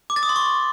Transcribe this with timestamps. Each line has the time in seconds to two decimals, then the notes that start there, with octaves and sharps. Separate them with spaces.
0.10 D6
0.16 A6
0.23 D#6
0.29 C6
0.36 C#6